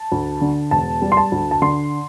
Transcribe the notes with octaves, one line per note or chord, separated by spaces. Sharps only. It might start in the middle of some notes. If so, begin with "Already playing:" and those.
Already playing: A5
D2
D3
E1 A5
G3
C6
A5
D2
A5
D3 C6